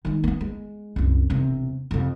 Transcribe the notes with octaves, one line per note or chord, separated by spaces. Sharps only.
D#3 G#3
A#3 B3
G#3
C2 F#2
E1 C3
F2 C3